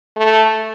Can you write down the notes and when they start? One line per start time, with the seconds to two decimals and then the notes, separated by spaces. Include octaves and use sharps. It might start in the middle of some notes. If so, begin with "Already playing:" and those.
0.17 A3